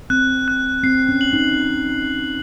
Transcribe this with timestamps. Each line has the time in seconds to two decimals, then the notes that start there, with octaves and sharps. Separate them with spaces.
0.10 C4 F#6
0.48 F#6
0.84 C4 C7
1.09 C#4
1.21 F#7
1.33 D#4